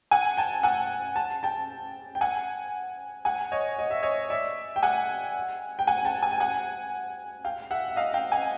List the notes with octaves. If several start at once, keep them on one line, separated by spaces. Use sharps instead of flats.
F#5 G#5
G5 A5
F#5 G#5
A5
G5 A5
G5
F#5 G#5
F#5 G#5
C#5 D#5
D#5
E5
C#5 D#5
D5 E5
G5
F#5 G#5
G5
F#5 G#5
G5 A5
G#5
G5
F#5 G#5
F5 G5
E5 F#5
E5
D#5 F5
F5 G5
F#5 G#5